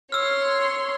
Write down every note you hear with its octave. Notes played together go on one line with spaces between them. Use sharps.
C#5 C6 E6 F6